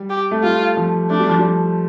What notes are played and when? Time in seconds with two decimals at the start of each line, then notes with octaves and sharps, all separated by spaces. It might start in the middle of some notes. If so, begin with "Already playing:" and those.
Already playing: G3
0.10 G4
0.31 A3
0.43 G3 F4
0.77 F3
1.10 A3 D4
1.20 G3
1.29 F3
1.39 G3